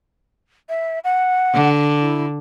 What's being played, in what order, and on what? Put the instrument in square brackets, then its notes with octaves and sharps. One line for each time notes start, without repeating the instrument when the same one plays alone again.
[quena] E5
F#5
[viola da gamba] D3
[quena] E4